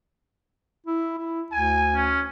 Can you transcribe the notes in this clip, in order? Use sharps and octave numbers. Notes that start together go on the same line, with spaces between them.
E4
E4
D2 G#5
C#4